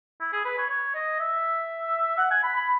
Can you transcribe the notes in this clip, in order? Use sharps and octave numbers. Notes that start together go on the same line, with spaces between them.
E4
G#4
B4
C#5
C#5
D#5
E5
F#5
G#5
B5
B5